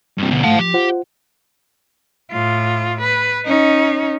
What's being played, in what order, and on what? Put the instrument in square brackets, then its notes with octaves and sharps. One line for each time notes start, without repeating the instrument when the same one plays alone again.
[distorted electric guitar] G2 C3
D2 B2
[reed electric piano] G#2 A3 F#5 [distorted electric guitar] F5 A5
[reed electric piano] F3 [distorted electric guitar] G4
[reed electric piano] F4 C5 F#5
[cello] A2 F4
B4
C#4 D#4